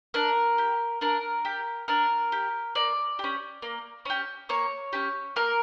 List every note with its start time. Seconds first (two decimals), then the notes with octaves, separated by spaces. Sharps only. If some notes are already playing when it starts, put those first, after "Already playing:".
0.14 D4 A#4
0.58 G4
1.01 D4 A#4
1.45 G4
1.88 D4 A#4
2.32 G4
2.75 A#3 D5
3.19 C#4 G4
3.62 A#3
4.05 C#4 G4
4.49 A#3 C#5
4.93 C#4 G4
5.36 A#3 A#4